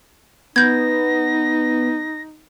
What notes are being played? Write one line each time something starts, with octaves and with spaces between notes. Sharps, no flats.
B3 D#4 G6 G#6 A#6